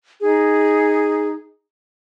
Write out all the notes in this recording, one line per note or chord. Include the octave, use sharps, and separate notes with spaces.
D#4 G#4